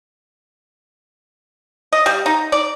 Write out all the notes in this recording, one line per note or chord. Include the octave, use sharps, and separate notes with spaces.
D#5
G3
D#4
D5